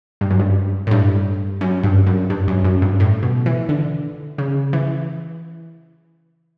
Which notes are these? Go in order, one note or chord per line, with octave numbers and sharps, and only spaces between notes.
G2
F#2
G2
A2
G2
F#2
G2
F#2
G2
F#2
F#2
G2
A2
B2
E3
D3
C#3
E3